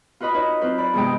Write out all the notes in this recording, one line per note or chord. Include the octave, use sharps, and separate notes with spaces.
F4 F#4 B4 D#5 B5
D#4 B4 C#5 D#5
F#3 C4 F4 B4 C5
D5 B5
E2 G2 C3 G#3 D#5 G5